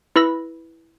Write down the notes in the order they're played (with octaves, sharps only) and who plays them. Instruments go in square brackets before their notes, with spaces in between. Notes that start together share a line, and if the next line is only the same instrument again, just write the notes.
[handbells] E4 B4 B5 E6 A#6